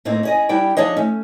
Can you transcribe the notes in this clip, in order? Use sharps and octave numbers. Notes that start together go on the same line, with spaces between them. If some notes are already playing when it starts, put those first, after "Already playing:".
A2 A#3 C4 D#4
C#4 G#4 D#5
G3 D4 E4 G5
F3 D4 G#4 C#5 D#5
A3 C#4